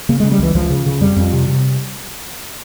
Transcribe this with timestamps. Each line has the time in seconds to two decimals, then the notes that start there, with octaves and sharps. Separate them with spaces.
0.09 C#3 A#3
0.20 C#3 G#3
0.32 G3
0.39 C#2 E3
0.55 C#2 F3
0.70 C#3
0.86 C#3
1.01 F2 G3
1.16 F2
1.33 C3
1.49 C3